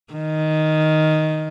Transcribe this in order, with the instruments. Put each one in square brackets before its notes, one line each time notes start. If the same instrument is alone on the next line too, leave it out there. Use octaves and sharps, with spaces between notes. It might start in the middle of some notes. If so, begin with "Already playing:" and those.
[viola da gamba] D#3